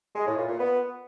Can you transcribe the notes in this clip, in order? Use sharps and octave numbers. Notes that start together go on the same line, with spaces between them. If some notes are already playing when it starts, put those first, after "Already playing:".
G#3
A2
A#2
A#2
B3